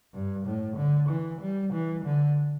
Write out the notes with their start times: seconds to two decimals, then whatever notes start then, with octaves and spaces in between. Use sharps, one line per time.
0.14 G2
0.46 A2
0.77 D3
1.09 E3
1.41 G3
1.73 E3
2.05 D3